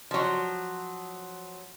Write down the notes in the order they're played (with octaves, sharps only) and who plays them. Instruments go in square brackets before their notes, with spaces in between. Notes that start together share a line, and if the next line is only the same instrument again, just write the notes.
[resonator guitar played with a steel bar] F3 F#3